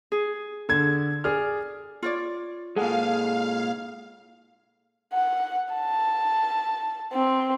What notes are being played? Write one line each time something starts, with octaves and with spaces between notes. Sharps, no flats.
G#4
D3 A4 G#6
G#4 D5 F6
F4 C#5 D5
A#2 G#3 G#4 A4 F5 F#5
F#5
A5
C4